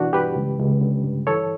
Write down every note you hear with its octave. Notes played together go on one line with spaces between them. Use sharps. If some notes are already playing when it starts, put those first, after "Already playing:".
Already playing: B2 E3 D4 F#4
G2 G4 B4
C#2
C#2
D3
G2
E3 A4 C#5